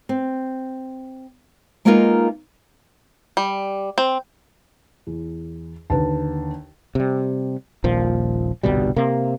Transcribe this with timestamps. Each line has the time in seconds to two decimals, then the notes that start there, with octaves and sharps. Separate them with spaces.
0.09 C4
1.85 G#3 A#3 B3 D#4 F4 A#4
3.37 G3
3.98 C4
5.07 E2
5.90 D#2 D3 B4 A5
6.95 C3 G3
7.84 D#1 A#1 A#2 F3
8.63 G1 C2 B2 G3
8.96 C3 A#3